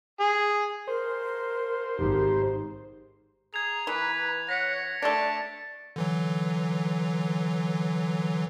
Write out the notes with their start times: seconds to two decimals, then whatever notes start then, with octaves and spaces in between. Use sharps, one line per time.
0.20 G#4
0.88 A#4 C5
1.98 G#1 D#4 G4
3.54 G#4 A#5 G#6 F7
3.87 E3 B4
4.49 C#5 F#5 A#6 B6 C#7
5.02 A3 D4 D5 A5 D7
5.96 D3 E3 F#3